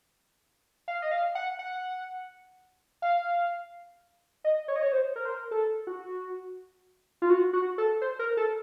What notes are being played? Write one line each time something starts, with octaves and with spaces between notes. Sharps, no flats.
F5
D#5
F5
F#5
F#5
F5
D#5
C#5
D#5
C#5
C5
A#4
C5
A#4
A4
F#4
F4
F#4
F#4
A4
C5
A#4
A4